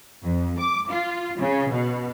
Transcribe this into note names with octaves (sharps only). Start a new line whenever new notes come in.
F2
D6
F4
C#3
B2